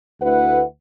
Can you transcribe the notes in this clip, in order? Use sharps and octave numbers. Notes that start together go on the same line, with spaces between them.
D2 E4 B4 F#5